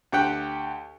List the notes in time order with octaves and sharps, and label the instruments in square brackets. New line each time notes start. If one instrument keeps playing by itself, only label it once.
[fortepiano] D2 G4 F#5 G5